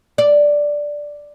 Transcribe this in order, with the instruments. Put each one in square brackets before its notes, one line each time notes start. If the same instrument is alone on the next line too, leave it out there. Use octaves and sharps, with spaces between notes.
[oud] D5